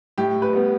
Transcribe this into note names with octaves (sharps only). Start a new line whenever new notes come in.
A2 G4
B4
G3 B3